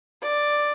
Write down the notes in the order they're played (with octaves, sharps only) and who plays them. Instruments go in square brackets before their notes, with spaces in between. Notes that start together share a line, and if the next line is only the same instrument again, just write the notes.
[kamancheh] D5